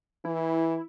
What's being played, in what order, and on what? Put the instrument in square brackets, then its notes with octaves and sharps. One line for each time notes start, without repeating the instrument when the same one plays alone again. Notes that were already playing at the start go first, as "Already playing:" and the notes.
[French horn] E3 [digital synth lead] E4